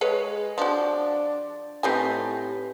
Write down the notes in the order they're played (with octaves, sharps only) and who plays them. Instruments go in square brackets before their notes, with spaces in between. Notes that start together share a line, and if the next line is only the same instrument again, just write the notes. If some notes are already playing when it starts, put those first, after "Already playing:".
[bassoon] G#3 [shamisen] G#4 B4 C#5
[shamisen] F3 F#4 [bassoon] D4
[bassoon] A2 [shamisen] C4 D#4 G#5 [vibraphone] G4 B4